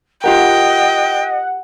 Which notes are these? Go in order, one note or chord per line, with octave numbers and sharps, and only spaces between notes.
F4 G4 A#4 D#5 F#5 G5